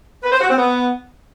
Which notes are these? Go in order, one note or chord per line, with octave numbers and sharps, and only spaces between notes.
B4
C5
F#4
C4
B3